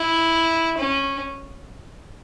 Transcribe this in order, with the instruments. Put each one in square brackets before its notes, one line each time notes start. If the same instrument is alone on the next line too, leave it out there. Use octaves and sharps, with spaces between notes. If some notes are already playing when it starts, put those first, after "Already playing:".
Already playing: [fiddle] E4
C#4